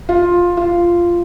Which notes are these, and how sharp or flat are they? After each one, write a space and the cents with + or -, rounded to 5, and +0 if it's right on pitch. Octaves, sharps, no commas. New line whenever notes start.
F4 +10
F4 -10